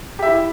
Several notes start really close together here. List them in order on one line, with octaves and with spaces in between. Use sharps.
G4 E5 E4